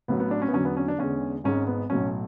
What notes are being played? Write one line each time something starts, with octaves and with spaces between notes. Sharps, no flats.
A1 A2 F#3 B3
B3
D4
C#4
B3
E2 D3 F#3 C#4
B3
C#4
D4
E2 D3 G#3 C#4
G#1 G#2 G#3 C#4
B3
B1 A2 F#3 C#4